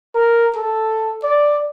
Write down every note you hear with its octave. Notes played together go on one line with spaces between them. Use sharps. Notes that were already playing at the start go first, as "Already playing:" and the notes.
A#4
A4
D5